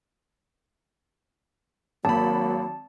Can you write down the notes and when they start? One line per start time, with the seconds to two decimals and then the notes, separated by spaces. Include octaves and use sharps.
2.05 G#1 F#3 A#3 A5 B5